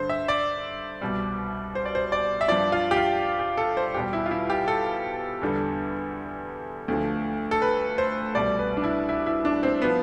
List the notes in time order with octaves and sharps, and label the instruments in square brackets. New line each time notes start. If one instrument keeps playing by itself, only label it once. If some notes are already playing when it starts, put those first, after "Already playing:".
Already playing: [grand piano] G2 D3 C5
E5
D5
C2 B2 G3
C5
D5
C5
D5
E5
G2 F3 D5
F4
G4
F4
G4
A4
C5
E2 B2 G3 G4
E4
F4
E4
G4
A4
E2 D3 G3
D2 D3 F3
A4
B4
C5
C2 B2 G3 D5
B4
D4
E4
E4
E4
D4
C4
F3 B3